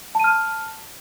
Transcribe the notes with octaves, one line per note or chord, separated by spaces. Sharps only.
A5 F6 D#7